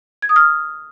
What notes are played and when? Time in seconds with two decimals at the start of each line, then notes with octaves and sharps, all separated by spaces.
0.22 G#6
0.29 D#6
0.36 F6